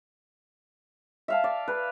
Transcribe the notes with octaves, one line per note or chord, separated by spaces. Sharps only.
E5 F5 A5
D5
B4